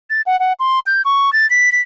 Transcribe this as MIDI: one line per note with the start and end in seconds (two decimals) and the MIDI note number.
0.10 0.21 93
0.26 0.39 78
0.40 0.53 78
0.60 0.79 84
0.86 1.02 91
1.05 1.32 85
1.33 1.48 93
1.50 1.72 95
1.72 1.81 95